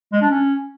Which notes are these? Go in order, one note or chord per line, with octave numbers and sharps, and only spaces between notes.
G#3
D4
C#4